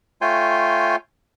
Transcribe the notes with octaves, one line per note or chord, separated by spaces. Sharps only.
A3 F4 C#5 G5 G#5 C6